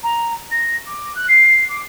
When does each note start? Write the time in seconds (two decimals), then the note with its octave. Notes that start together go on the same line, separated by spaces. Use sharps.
0.03 A#5
0.50 A#6
0.86 D6
1.15 F#6
1.28 C7
1.68 D6